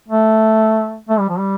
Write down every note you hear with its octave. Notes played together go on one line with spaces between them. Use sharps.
A3
A3
G3
F3
G3